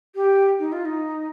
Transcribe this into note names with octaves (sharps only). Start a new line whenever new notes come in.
G4
D#4
F4
D#4